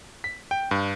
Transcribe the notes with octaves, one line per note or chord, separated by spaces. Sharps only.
B6
G5
G2